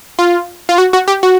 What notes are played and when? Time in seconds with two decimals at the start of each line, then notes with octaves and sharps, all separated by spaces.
0.19 F4
0.69 F4
0.78 F#4
0.93 F#4
1.08 G4
1.23 F#4